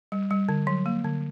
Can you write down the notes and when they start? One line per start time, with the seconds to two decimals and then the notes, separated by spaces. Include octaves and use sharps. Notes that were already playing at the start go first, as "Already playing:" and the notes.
0.12 G3
0.31 G3
0.49 D3
0.67 F#3
0.86 A#3
1.04 D3